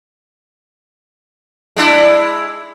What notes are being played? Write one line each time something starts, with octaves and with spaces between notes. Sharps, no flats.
G#3 D4 E4